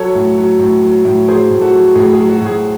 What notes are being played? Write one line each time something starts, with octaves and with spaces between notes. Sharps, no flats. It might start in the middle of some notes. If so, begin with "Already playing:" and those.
Already playing: F#3 A4 C#5
A2
F#3
A2
F#3
A2
F#3 G#4 C5
A2
F#4 A4
F#3
A2 G#4
G#4
F#3
F#4
A2
G#4